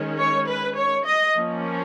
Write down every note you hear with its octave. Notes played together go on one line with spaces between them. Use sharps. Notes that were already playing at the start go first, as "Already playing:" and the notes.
Already playing: D#3 G#3 C#4
C#5
B4
C#5
D#5
F3 A#3 C#4